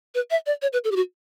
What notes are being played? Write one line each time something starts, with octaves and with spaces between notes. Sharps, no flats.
B4
E5
D5
C#5
B4
A4
G4
F#4